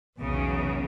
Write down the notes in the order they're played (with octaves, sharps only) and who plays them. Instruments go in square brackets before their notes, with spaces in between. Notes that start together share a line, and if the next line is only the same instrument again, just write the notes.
[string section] B1 E2 C#3